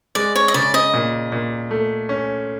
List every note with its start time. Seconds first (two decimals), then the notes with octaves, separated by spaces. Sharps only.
0.15 G#3 D5
0.35 C#5
0.48 D#5
0.54 C#3 D5
0.74 D#5
0.94 A#2
1.32 A#2
1.71 A3
2.09 C#4